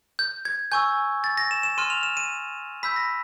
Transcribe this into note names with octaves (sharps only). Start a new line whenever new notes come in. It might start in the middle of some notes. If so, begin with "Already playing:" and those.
G6
G#6
G#5 C#6 E6 G6
A6
A#6
E7
E7
C6 F6 D#7
F7
E7
D#7
B5 E6 G6 B6
A#6